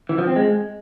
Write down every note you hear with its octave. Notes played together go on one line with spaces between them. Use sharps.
E3
F3
C4
G#3